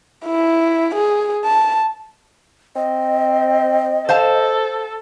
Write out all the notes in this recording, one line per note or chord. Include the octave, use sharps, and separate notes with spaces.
E4
G#4
A5
C4 D#5
A4 C5 F5 A5